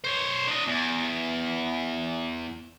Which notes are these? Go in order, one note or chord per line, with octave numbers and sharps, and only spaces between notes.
C5 C#5
D4 D#5
E2